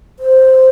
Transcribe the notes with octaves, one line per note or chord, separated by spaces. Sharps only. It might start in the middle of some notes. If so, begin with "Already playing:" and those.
C5